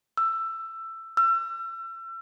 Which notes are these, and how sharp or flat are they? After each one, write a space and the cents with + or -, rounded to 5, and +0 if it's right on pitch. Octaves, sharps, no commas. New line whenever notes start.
E6 +15
E6 +35